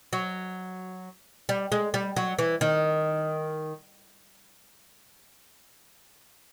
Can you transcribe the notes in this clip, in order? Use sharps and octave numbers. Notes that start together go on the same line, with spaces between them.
F#3
G3
G#3
G3
F#3
E3
D#3